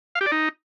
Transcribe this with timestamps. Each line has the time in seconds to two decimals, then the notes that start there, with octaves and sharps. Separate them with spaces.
0.15 F5
0.21 G4
0.26 D5
0.32 D#4